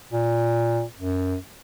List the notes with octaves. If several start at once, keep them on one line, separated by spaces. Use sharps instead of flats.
A#2
F#2